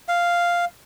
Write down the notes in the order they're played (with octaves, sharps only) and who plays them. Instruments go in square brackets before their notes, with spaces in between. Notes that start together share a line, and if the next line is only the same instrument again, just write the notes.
[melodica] F5